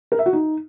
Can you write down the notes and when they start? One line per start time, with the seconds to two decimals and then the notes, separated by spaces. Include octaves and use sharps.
0.12 A#4
0.19 E5
0.26 F#4
0.33 D#4